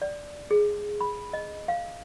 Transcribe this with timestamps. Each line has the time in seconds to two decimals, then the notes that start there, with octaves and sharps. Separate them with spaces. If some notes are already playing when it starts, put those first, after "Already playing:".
0.02 D5
0.51 G#4
1.01 B5
1.33 D#5
1.68 F5